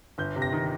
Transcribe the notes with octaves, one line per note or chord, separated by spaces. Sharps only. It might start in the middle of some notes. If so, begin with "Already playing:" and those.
G1 G6
C3
A#6
D#3